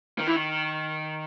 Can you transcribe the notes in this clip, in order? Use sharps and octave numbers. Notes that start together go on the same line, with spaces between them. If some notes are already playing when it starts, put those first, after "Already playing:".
D#3
E3
D#3